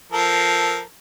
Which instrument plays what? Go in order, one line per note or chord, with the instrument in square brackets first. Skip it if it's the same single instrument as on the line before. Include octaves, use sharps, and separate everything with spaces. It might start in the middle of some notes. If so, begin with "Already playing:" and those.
[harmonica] F3 A4 A#4